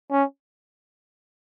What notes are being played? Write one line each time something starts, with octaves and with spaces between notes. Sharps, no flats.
C#4